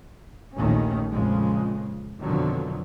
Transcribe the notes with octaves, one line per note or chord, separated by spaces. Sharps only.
A#1 D#2 D#3 A3 C#4
F2 A#2 C#3 F3 G#3
F2 B2 D3 D#3 F3 F#3